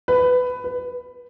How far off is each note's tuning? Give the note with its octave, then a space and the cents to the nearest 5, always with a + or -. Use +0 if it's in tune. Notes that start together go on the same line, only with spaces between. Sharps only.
B4 +15
B4 -20